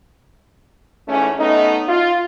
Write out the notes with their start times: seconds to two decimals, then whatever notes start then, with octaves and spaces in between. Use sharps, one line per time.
1.08 G#2 E3 A3 C#4
1.38 A3 B3 C#4 D#4
1.88 F4